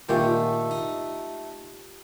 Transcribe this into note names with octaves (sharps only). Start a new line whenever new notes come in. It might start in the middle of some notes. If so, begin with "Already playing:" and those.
A#2 D3 D#3 G#3 A3 F4 G4
D#4